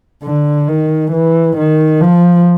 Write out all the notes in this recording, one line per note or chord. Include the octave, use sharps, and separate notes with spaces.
D3
D#3
E3
D#3
F3